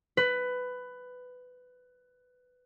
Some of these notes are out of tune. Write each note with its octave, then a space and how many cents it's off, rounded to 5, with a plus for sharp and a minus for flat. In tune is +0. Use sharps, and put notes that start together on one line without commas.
B4 +15